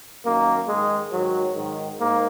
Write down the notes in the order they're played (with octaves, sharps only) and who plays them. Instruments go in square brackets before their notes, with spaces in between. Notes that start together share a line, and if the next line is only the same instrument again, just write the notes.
[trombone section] F#2 D#3 A#3
G#2 D#3 G#3
G#2 D#3 F#3
G#2 D#3
G#2 A#3